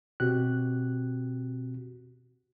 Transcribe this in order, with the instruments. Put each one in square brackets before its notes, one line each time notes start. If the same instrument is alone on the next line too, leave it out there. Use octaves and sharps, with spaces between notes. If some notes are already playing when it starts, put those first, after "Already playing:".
[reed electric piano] B2 C4 F#4 G4 F#6